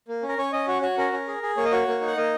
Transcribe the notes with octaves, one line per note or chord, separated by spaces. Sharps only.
A#3
C#4
A#4
C#4 C#5
C#4 D#5
F#4 C#5
F#4 C#5
C#4 A#4
C#4
G#4
G#4
A#3 C#5
D#5
F#4 C#5
A#3
D#4
F#5
A#3 D#5